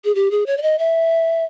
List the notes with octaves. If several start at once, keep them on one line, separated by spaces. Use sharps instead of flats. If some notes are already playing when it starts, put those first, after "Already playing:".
G#4
G4
G#4
C#5
D5
D#5
E5